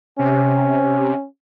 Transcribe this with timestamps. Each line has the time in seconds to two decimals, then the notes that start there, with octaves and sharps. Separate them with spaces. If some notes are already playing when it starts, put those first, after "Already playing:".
0.19 C3 C#4